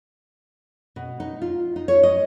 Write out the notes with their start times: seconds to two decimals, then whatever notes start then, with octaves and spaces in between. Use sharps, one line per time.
0.96 B2
1.20 D#4
1.42 F4
1.76 D#4
1.88 C#5
2.03 D#5